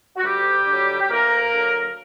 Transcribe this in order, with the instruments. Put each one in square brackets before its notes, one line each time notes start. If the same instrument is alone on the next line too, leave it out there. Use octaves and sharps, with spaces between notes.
[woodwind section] F#4
D2 G3 G4
D3 F#3
G4
D2 A#3 A#4
D3 F#3